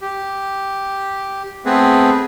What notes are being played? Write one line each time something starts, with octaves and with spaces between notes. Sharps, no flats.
G4
A3 B3 C4 G#4 B4